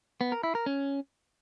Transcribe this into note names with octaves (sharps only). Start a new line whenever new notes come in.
B3
A#4
E4
A#4
C#4